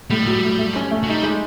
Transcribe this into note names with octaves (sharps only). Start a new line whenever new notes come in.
A2 G3
F#3
A2
A3
C#4
A3
F#3
G3 D#4
G#3